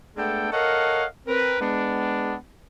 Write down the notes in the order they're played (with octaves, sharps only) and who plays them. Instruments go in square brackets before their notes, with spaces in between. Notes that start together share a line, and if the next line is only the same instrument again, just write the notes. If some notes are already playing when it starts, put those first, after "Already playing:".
[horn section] G#3 A3 B3 D4 A4 G5
A4 A#4 C#5 D#5 F5 F#5
C4 A#4 B4
G#3 B3 D4